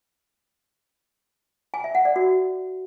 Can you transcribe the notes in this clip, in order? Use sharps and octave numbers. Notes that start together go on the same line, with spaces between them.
G#5
E5
F#5
D5
F#4